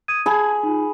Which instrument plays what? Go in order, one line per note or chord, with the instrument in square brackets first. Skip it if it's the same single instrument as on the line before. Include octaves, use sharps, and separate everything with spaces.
[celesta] D#6 G#6 D#7
[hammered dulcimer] G#4 B5 [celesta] A5 G#6
[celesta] D#4 F4